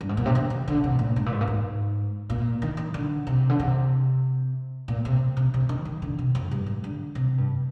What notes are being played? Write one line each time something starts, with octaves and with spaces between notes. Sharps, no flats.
G2
G#2
A#2
C3
D3
D#3
D3
C3
G#2
A#2
G#2
A#2
G#2
A#2
G#2
A#2
D#3
D#3
D3
C3
D3
C3
A#2
C3
C3
C3
D#3
D#3
D3
C3
F2
G2
G#2
D3
C3
G2